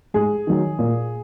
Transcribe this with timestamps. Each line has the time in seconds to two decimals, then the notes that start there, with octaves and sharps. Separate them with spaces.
0.14 G#2 G#4
0.47 D#3 F#3
0.79 A#2